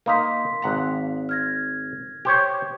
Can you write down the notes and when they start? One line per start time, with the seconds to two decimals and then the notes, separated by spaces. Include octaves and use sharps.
0.06 A#3 D#4 F5 A#5 C6 B6
0.62 G#1 F#5 A#5
1.29 F6 G#6 A#6
2.25 G4 C5 C#5